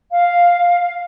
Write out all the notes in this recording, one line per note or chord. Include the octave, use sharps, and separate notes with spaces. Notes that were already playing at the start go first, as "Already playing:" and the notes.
F5